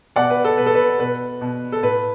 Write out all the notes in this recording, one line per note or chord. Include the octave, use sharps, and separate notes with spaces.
B2 D5 F#5
B4
A4
B2 B4
A4
B4
B2 B4
B2
A4
A2 B4